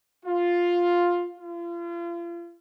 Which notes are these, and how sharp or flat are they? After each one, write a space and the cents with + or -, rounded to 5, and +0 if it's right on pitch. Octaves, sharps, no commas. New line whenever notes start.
F4 +5
F4 -35